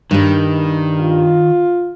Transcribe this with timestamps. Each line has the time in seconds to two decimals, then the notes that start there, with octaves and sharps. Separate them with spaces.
0.11 G2 D#3 G3
1.01 F4